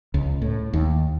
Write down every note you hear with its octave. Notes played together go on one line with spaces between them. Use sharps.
C#2
A2
D#2